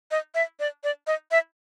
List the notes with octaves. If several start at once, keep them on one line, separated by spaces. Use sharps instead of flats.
D#5
E5
D5
D5
D#5
E5